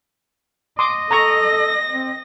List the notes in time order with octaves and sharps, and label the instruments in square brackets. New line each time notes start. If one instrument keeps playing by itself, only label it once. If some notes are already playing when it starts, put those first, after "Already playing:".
[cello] D#5 [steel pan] C6 D6 D#6
[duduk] A4 [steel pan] A#5 C#6 [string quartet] A#6
[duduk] C4